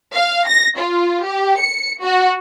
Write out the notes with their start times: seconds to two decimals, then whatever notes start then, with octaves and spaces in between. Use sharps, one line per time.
0.15 F5
0.47 A#6
0.79 F4
1.25 G4
1.59 C#7
2.03 F#4